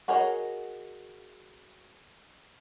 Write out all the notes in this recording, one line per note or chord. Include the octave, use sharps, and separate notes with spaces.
F#4 G#4 A#4 C#5 D#5